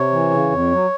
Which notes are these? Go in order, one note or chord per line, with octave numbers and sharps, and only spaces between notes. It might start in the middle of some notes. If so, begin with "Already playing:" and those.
Already playing: C3 C#5
E3
C#3
F2
F#3